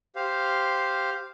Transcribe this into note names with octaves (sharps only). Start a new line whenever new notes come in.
G4 C5 F5